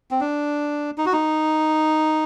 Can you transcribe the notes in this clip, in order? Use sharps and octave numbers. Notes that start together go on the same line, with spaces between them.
C4
D4
D#4
F#4
D#4